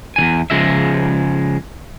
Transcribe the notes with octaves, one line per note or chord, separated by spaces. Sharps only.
E2 D#3 G#5
C#3 F3 G#3 E5